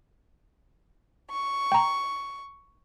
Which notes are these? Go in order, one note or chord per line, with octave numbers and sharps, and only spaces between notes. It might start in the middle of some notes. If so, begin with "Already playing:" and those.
C#6
G5 A#5